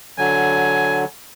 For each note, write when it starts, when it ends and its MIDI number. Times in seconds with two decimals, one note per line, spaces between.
0.18 1.05 50
0.18 1.05 54
0.18 1.05 80